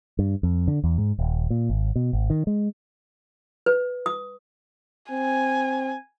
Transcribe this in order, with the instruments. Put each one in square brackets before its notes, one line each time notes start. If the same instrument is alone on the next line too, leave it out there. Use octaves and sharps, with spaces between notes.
[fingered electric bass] G2
F2
D3
E2
G#2
D#1
A#2
G#1
B2
G#1
D#3
G#3
[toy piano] B4
D#6
[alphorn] C4 [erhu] G#5